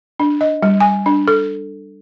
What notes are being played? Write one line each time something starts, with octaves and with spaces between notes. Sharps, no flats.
D4
D#5
G3
G#5
D4
A4